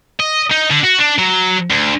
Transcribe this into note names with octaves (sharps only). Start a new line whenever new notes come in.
D#5
D#4
D3
F#4
D4
F#3
D2